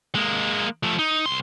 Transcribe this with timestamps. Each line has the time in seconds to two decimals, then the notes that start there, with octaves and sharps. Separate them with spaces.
0.15 G#3 A#3
0.84 F3 A3
0.99 D#4
1.26 C2 C6